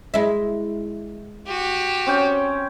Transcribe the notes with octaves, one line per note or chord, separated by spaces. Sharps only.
G#3 E4
F#4 G4
C4 C#4 G5